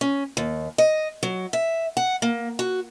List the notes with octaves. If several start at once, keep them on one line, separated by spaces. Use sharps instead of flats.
C#4
D#2
D#5
F#3
E5
F#5
A#3
F#4